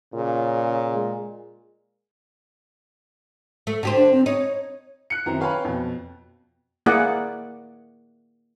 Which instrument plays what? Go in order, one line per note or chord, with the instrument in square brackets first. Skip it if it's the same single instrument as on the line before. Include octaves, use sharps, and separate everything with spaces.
[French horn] A#2 [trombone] C#3
[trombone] G#3
[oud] A3
D3 G4 C5
[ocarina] D4
C4
[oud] D#4 [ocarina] C#5
[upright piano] F#6 C#7
F#2 D#3 C4 E4 A#5
B4 C#5 F5 G5 G#5 B5
F2 B2
[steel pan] A#3 E4 G#4 D5 F#5